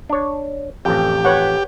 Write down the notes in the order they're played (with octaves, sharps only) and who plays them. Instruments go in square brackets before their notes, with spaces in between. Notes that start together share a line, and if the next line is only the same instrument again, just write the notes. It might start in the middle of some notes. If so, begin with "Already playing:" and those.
[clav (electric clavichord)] D4 C#5
[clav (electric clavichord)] A1 F2 [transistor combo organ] G4
[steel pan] B4 C#5 F#5